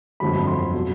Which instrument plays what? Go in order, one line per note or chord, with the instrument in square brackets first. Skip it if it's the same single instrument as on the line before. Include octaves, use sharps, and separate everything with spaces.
[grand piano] G1 F2 D3 F#3 B5
C6
B2 F#3